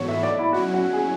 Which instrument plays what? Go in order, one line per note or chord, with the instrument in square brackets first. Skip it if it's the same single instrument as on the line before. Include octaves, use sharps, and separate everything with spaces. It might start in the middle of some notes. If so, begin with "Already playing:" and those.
Already playing: [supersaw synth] G#2 E3 B3 F#4 A4 [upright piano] C#5
[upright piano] E5
D5
E4
[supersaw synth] F#3 C#4 E4 [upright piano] F#4
[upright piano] F#4
G#4